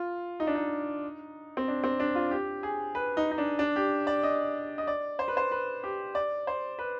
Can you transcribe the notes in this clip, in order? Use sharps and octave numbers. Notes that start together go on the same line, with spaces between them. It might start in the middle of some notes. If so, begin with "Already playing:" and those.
Already playing: F4
D#4
D4
D#4
C4
D4
C4
D4
F4
G4
G#4
B4
D#4
D#4
D4
D4
G4
D5
D#5
D#5
D5
C5
B4
C5
B4
G4
D5
C5
B4